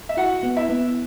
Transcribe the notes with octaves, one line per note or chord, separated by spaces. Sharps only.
E5
E4 F#4 F#5
B3
E4 E5
B3